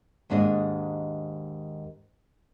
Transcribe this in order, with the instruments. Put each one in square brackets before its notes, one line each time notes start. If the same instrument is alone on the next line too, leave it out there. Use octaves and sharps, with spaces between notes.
[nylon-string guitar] D#2 G#2 D4 A#4 D#5